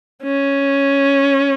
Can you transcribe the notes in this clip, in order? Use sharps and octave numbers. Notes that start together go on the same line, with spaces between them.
C#4